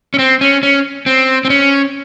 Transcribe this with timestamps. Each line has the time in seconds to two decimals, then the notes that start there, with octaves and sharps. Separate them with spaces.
0.14 C#4
0.19 C4
0.41 C#4
0.63 C#4
1.06 C4
1.45 C4
1.50 C#4